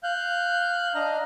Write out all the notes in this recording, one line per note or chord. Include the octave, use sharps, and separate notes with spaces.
F5 F#6 G6
D4 D#5 F5 A#5